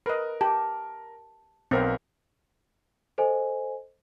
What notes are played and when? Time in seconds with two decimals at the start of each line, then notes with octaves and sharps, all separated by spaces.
0.06 A#4 B4 D#5
0.41 G4 A5
1.71 B1 B3 C4 A#4 F5
3.18 A4 C5 D#5 G#5